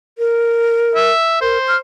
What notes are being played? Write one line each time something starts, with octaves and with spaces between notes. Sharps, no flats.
A#4
E5
A#4 C5
F6